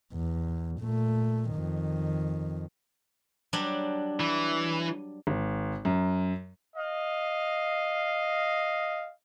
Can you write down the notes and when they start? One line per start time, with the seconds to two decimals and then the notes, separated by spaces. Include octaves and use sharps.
0.13 E2
0.80 A#2 A3
1.52 F2 D#3
3.53 F#3 G3 D4
4.20 E3
5.27 G#1
5.85 F#2
6.76 D#5 F5